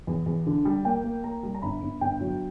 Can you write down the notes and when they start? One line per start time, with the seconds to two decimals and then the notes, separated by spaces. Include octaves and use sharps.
0.07 E2
0.26 E2
0.47 D3
0.65 G3
0.85 A#3 G5
1.04 A#3
1.24 A#3 A#5
1.43 G3
1.55 A#5
1.62 G1 B5
1.82 G1
2.01 G1 G5
2.21 F#3